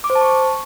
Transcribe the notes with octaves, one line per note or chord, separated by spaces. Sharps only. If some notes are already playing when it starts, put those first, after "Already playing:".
D6
C5
A5
C#6